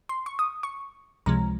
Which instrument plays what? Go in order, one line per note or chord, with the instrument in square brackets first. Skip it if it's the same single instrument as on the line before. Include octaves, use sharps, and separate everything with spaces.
[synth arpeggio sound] C6
C#6
D#6
C#6
C#2 C3 F3 G#3 A#5